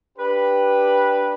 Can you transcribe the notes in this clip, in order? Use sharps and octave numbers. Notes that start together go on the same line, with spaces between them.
D4 G4 B4